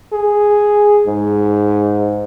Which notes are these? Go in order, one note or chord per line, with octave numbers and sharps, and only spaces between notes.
G#4
G#2